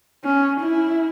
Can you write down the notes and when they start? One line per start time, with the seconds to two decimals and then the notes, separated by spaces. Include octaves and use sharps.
0.24 C#4
0.60 E4